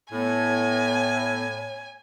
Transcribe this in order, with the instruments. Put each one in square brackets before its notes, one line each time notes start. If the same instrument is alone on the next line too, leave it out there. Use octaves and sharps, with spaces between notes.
[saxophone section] A2 [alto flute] B3 [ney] C#5 [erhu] G#5